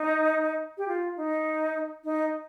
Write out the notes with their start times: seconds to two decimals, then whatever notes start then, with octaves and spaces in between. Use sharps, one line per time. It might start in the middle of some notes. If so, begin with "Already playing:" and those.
Already playing: D#4
0.78 G4
0.88 F4
1.17 D#4
2.05 D#4